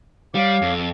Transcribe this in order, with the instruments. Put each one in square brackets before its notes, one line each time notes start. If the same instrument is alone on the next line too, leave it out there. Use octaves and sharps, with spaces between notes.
[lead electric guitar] G3 [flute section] C#5 F5 D6
[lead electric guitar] F2